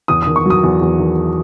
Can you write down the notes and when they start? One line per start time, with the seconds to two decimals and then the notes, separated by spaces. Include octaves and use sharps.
0.08 E2 D#6
0.23 D#3 D#6
0.36 C#6
0.46 F#3 D#6
0.63 E2
0.82 E2
0.99 D#3